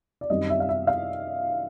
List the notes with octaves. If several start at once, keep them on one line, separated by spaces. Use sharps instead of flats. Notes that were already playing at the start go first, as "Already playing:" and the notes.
D5
F#2 D#3 G3 C4 D#5
E5
F5
E5
F5